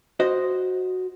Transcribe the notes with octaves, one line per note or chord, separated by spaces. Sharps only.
F#4 C5 D#5